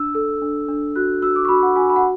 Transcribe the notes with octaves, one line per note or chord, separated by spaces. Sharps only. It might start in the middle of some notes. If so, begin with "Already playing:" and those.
Already playing: D4 E6
A4
D4
D4
F#4 F#6
F#4 E6
D6
C#6
F#4 B5
F#5
F#4 G#5
B5
F#5